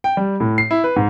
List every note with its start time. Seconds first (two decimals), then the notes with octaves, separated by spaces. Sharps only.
0.04 G5
0.17 G3
0.40 A2
0.58 C7
0.71 E4
0.84 B4
0.96 G#2